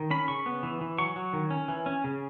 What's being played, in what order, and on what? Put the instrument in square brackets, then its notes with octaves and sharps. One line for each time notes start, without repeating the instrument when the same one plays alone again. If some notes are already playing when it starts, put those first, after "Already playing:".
Already playing: [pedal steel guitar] D#3
C#4 B5
C#3 C#6
B3
E3
E3
F#3 C#6
F#3
D#3
C#4
E3
C#4
C#3